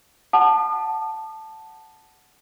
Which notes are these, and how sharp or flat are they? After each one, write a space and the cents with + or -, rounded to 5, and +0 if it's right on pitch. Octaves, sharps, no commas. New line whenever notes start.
F#5 +0 A5 +0 D#6 -45